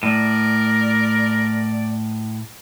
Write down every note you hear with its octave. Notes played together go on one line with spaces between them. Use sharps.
A2 A#4 D5